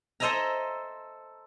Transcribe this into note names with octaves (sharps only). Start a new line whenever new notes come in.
A4 C5 D#5 E5 G#5 A#5